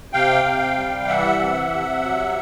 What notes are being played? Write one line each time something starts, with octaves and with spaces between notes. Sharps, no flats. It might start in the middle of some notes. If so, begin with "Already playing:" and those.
C3 F5 G5
C3
G3
E3 E5 F#5
C3
C3
F#3